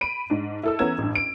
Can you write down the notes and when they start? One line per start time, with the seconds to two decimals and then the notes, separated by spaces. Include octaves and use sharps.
0.01 B5 D7 D#7
0.30 G#2 D4
0.63 E4 A4 E6
0.79 E3 B3 C#4 A#5 G#6 E7
0.98 A1 G2
1.15 D7